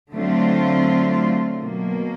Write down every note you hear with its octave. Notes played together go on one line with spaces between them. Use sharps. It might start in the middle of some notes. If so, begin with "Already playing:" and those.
D3 F#3 A3 C4 F4
B2 F#3 A#3